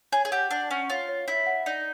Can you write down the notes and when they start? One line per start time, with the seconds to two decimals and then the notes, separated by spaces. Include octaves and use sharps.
0.12 G#4 C#5
0.25 G#4
0.32 G4 F#5
0.51 D4 F#5
0.70 C#4 F#5
0.90 F4 C#5
1.09 C#5
1.28 E4 C#5
1.46 F#5
1.66 D#4 D5